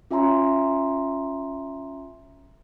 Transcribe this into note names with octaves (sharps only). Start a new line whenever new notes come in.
C#4 F4 E5 G#5 A#5 C6